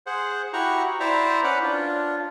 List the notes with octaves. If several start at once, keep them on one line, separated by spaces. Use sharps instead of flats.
G#4 C5 F#5
E4 F#4 G4 F#5 A#5 C#6
E4 C5 D5 E5 A#5
C#4 B4 D5 F#5
D4 F4